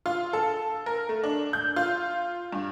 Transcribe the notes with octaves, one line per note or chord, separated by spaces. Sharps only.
F4
A4
A#4
A3
D4
G6
F4
G2